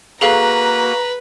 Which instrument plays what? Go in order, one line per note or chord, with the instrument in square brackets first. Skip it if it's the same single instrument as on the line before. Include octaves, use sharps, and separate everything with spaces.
[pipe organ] A#3 F#4 [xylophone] G#4 A4 F5 [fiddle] B4 [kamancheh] A#5